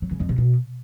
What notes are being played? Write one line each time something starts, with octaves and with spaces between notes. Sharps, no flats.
F#3
C#3
F2
C3
B2